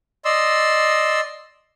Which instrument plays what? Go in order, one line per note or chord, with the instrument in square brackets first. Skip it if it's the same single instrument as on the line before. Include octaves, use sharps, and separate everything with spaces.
[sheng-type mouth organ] D5 D#5 C6 E6